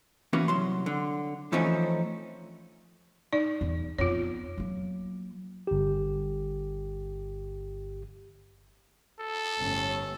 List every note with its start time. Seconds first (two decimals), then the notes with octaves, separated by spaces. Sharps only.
0.33 E3 A#3 B3 C#4 F#4
0.48 C2 F#3 C6
0.86 D3
1.52 E3 F3 A3 C4 C#4 D#4
3.33 D#4 D5
3.61 E2
3.98 F2 B3 F4 C#5
4.58 F#3 A#3
5.67 G1 G4
9.20 A4
9.60 G1 A2 C#4